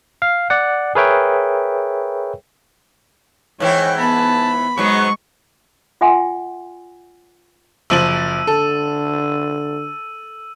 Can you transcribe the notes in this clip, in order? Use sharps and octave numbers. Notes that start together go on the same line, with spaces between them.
F5
D5 F#5
G#4 A#4 B4 C#5 E5 G5
G#2 E3 E4 C#5 G5
B3 A5 B5
G#2 F#3 G#3 B3 C#6
F4 E5 F#5 G#5 C6
F#1 F3 E6 D#7 F#7
D3 A4